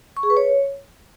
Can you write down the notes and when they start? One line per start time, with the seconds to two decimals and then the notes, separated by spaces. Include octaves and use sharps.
0.17 C#6
0.23 G#4
0.30 B4
0.37 C#5